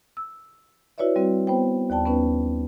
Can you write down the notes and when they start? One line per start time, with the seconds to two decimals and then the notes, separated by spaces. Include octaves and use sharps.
0.17 E6
0.98 E4 F#4 B4 C#5 D5 E5
1.16 G3 C4 F#4
1.47 B3 C5 G5
1.90 D#2 D5 G5 A5
2.06 B3 C#4 D#4 B4